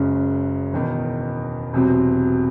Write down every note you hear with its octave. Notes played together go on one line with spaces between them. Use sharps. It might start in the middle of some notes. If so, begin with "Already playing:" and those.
Already playing: F#1 F#2 C#3 G#3
E1 E2 D#3
E1 E2 C3 F#3 C4